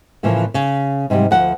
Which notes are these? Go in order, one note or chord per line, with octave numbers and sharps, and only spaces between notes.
A2 C#3 E3 F3 A#3
C#3
G#2 C3 F#3 G3
D2 F3 F#5